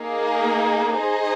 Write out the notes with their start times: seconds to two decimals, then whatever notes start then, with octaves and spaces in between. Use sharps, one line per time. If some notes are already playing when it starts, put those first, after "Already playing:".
Already playing: A#3 D#4 G#4
0.97 D#4 G#4 C5 D#5